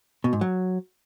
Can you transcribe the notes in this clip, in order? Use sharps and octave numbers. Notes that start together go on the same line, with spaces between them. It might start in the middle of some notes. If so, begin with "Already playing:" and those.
B2
G#2
F#3